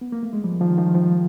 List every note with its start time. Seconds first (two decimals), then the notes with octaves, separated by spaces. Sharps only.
0.01 B3
0.12 A#3
0.23 A3
0.33 G#3
0.44 F3 G3
0.61 D#3 F3
0.78 D#3 F3
0.94 D#3 F3